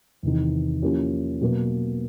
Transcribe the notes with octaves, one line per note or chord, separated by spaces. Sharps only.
E2 C3 D#3
F3 A#3 C#4 E4 G4
B2 F#3 A#3